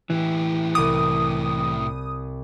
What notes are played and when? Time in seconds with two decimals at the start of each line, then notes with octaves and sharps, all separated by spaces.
0.10 A2 E3 G4
0.75 C2 D6 D#6